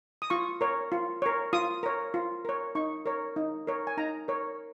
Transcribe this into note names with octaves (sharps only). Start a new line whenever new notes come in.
D#6
F4 C#6
A#4 C#5
F4
A#4 C#5
F4 D#6
A#4 C#5
F4
A#4 C#5
D#4 C#6
A#4 C#5
D#4
A#4 C#5
G#5
D#4 A#5
A#4 C#5